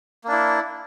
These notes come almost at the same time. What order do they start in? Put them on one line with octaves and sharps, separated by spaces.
A#3 D4 E4